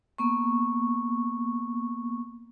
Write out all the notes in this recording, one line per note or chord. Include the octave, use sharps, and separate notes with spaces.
A#3 B3 C#6